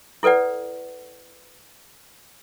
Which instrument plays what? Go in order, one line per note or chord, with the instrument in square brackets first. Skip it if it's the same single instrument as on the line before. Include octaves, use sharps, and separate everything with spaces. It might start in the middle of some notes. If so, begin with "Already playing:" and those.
[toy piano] E4 A4 B4 D5 F#5